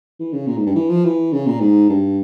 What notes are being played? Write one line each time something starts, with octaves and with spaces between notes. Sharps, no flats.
E3
C#3
A#2
G#2
G2
E3
F3
E3
C#3
A#2
G#2
G2